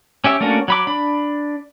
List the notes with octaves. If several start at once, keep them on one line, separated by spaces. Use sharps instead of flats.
C#4 G4 E5
A3 A#3 C#4 D4 F#4
F#3 B5 D6
D4 B5